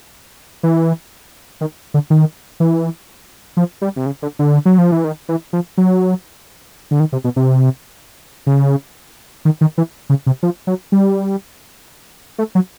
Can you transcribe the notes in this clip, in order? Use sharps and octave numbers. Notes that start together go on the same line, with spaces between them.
E3
D#3
D3
D#3
E3
F3
G3
C3
C#3
D3
D3
F#3
F3
E3
D#3
E3
F3
F#3
D3
D#3
C3
B2
C3
C#3
D#3
D#3
E3
C#3
C3
F3
F#3
G3
A3
F#3